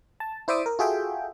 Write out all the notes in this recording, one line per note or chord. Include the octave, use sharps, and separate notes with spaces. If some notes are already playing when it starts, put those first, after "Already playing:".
A5
E4 C5 D5 E5 D6 D#6
A#4
F4 F#4 G#4 A4 E5 G5